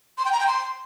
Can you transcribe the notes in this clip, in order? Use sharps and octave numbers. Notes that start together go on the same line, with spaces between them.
C6
G5
A#5
G5
C6